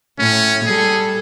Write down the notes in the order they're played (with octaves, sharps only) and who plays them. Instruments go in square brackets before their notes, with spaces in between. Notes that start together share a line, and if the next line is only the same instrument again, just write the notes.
[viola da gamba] A2 [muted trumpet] C#4
[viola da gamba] G3 A4 [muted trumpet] G#4